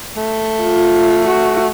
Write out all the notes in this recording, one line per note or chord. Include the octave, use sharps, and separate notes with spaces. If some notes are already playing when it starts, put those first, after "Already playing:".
A3
F4
F#4